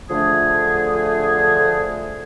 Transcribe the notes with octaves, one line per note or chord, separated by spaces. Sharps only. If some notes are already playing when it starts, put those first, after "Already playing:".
D3 F3 A3 G#4